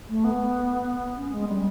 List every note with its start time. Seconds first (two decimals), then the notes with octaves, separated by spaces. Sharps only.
0.09 A3
0.24 B3
1.17 C#4
1.32 G#3
1.48 G3